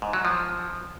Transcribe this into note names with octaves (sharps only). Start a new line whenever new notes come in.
G#2
F#3
F3